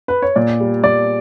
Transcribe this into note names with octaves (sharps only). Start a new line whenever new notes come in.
B4
C#5
A#2 D5
G3
A#2 D5